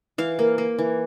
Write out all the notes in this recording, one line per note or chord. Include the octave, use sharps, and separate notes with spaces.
E3 F5
A#3
A#3
E3